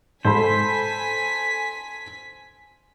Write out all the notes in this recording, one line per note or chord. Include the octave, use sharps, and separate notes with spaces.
G#2 A4 C5 G#5 B5 B6